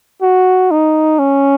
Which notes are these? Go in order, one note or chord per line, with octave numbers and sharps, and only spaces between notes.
F#4
D#4
C#4